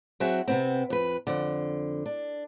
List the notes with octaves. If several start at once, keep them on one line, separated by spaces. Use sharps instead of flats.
F#3 C4 F#4 G#4 E5
C3 B3 C4
F2 B4
F2 D3
D4